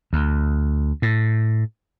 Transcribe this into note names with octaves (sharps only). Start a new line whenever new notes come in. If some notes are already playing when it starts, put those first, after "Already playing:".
D2
A2